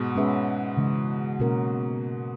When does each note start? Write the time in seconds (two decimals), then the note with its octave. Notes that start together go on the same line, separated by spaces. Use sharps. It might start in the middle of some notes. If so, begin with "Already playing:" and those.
Already playing: G#2 B2
0.16 G#3 C#4 G#4 B4 E5
0.77 C#3 E3 G#3
1.40 B2 A#3 C#4 F#4 A#4